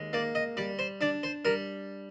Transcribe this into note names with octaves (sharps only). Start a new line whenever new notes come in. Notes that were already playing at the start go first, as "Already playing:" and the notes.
Already playing: D#2 G#3
A#3 D5
D#5
G3 D5
C5
D4 D5
C5
G3 A#4